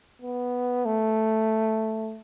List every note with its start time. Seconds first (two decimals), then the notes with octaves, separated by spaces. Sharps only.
0.22 B3
0.86 A3